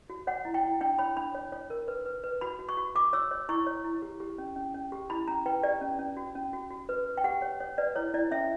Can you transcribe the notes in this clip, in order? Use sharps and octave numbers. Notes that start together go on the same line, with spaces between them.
F#4
C#5 F#5
E4
G5
E4
D4 G5
C#5 B5
D4 B5
C#5
C#5
A#4
B4
B4
B4
F#4 B5
F#4
C#6
F#4
F#4 D6
C#5 E6
C#5
E4 C#6
C#5
E4
G4
G4
C#4
C#4
C#4
G4
E4 B5
C#4 A#5
B4 G5
G4 D5
C#4
C#4
F#4
C#4
F#4
F#4
B4
B4
G5
G4 F#5
C#5
C#5
B4 D5
E4 C#5
E4 D5
C#4 E5